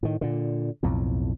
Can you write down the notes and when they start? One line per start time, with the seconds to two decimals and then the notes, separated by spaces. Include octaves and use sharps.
0.03 A2 D#3
0.21 A#2 D3
0.83 B1 F2 A2